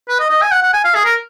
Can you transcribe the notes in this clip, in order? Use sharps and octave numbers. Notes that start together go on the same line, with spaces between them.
B4
D#5
D#5
G#5
F#5
F#5
G#5
F5
G#4
A#4